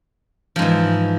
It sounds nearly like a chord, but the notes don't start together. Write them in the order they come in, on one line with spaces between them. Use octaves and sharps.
F3 G#2 E3